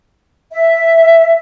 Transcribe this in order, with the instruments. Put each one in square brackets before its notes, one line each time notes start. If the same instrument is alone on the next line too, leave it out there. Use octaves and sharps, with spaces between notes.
[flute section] E5